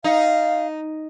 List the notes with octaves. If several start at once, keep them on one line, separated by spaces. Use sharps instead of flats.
D#4 F5